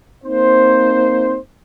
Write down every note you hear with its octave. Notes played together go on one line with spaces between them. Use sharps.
A#3 C4 D#4 C5